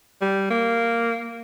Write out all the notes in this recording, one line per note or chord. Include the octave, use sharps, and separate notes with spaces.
G3
A#3